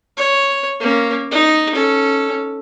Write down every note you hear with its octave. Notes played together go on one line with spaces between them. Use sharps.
C#5
A#3 C#4
D#4
C#4 A4